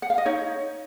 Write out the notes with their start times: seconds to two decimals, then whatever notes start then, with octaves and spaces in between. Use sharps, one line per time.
0.02 F#5
0.10 F5
0.18 D#5
0.25 D#4 C#5